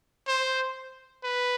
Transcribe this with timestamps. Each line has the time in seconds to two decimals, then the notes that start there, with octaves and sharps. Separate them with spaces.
0.27 C5
1.24 B4